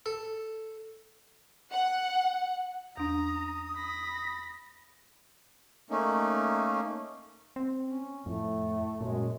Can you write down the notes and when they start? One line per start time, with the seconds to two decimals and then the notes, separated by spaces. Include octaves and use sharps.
0.06 A4
1.73 F#5
2.97 E2 D4 A#5 D#6
3.76 B5 A#6
5.90 A3 A#3 C#4 D#4
7.56 C4
7.88 C#4
8.26 F2 A2 A3
9.01 F#2 A#2 G#3